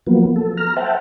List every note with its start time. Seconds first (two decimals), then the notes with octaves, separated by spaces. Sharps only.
0.07 F3 F#3 A#3 B3
0.36 A4
0.57 A#5 F6
0.76 C5 E5 F#5 G5 A5